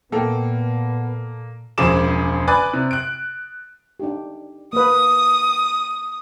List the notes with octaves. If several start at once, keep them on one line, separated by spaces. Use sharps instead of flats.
A#2 A#3 B3 A4 G5
E1 C#2 F3 G#4 D6 E7
B4 D5 G#5 D6 F#6 A6
C3
F#6 D7
D4 D#4 G4
A#3 B4 D#6